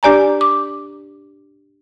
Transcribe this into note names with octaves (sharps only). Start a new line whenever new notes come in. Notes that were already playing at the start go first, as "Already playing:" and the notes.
D4 G4 D5 G#5 A#5
D6